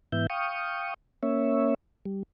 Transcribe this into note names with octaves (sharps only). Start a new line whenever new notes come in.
G#2 E3 B3 E5 G6
F5 G5 C#6 D#6
A#3 C#4 C#5 E5
G3